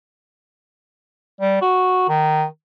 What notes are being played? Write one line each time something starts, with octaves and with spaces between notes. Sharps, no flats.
G3
F#4
D#3